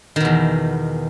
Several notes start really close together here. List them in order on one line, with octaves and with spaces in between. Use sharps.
D#3 B2 E2